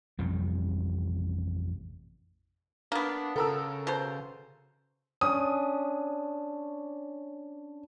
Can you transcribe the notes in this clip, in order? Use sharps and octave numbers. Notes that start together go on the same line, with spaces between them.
A1 F2 C3 G3
A#3 B3 D4
C#3 A4 A#4 E6
B2 C5
C#4 D4 D#6